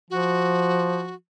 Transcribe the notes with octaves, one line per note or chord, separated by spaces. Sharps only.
F3 F#4